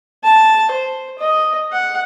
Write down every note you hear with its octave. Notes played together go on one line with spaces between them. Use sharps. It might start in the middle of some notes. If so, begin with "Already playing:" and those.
A5
C5
D#5
F#5